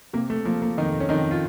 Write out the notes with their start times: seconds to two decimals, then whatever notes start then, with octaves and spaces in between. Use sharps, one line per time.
0.13 C3 A#3
0.30 A3
0.45 F3 A#3
0.62 A#3
0.77 F2 D#3 D#4
1.00 C#4
1.09 F2 D#3 D#4
1.31 F4